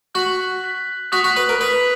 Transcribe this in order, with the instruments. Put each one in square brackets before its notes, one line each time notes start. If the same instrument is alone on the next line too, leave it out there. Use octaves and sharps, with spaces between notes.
[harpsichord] F#4 [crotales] F#6 B6 F#7
[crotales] F#6 B6 F#7
[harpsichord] F#4 [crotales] D#6 F#6 B6
[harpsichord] F#4
B4
A#4
[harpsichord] B4 [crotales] D#6 F#6 B6